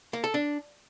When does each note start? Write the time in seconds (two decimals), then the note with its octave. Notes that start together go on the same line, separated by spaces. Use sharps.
0.13 A#3
0.24 A4
0.34 D4